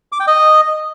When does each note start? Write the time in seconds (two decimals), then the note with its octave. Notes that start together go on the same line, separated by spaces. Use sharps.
0.12 D6
0.20 G5
0.27 D#5